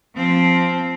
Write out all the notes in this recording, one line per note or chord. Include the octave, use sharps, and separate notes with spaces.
F3 C4